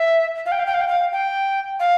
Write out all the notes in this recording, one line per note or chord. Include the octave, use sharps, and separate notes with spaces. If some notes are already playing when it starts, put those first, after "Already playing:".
Already playing: E5
F5
G5
F5
G5
F5
G5
F5
G5
F5